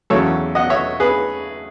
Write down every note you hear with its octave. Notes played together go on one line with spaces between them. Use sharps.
E2 C#3 F#3 A4 C#5
D#5 F#5
C#5 E5
G#4 B4